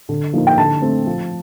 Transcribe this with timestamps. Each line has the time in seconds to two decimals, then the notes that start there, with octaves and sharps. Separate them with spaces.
0.09 D3
0.33 F3 A#3 D#4
0.47 G5
0.57 D3 A5
0.82 A3 C4
1.07 F3